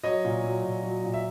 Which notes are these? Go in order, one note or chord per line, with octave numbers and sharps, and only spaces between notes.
F#3 C#5 D#5
A#2
F#3
A#2
F#3
A#2
E5